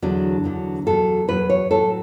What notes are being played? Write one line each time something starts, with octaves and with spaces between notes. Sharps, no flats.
E2 D3 F#3 D4
E2 D3 F#3
E2 B2 F#3 A4
E2 B2 F#3 B4
C#5
A2 F#3 A4